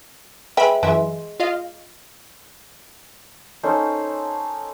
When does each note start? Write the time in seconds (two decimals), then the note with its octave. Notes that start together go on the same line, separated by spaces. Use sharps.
0.57 G#3 B4 E5 G5 B5
0.83 F#2 E3 G#3 E5
1.40 F4 D#5 F5
3.63 C#4 D#4 A4 C5